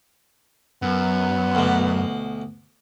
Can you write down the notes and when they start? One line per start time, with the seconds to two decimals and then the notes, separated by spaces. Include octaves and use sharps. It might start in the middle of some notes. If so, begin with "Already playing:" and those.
0.82 F#2 B3
1.55 D2 B2